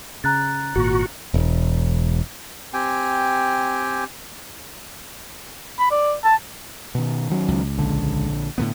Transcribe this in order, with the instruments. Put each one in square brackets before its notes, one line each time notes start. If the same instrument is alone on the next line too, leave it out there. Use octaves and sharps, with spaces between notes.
[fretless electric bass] C#3 [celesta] A#5 F#6 A6
[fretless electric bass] G#1 A#2 [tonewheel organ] F#4
[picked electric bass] E1
[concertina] C4 G4 G5 G#5
[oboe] B5
D5
A5
[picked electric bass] B2 D#3
D#3 F#3 C#4
[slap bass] C#2
[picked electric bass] A#1 D3
[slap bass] A2 D3 B3